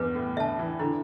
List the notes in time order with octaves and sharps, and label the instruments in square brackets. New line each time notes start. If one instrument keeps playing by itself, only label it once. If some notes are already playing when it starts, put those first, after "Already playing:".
Already playing: [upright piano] E2 G2 [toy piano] B4
[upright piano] A2
[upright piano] D3 [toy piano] E5 A5
[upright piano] E3
[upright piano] D3 [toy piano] E4